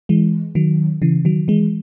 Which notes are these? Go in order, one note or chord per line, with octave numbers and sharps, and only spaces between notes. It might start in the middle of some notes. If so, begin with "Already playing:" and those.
E3 G#3
D#3 F#3
C#3 E3
D#3 F#3
E3 G#3